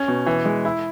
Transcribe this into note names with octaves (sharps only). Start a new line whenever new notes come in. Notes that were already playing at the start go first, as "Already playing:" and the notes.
Already playing: C#4
B2
E3
G#3
E4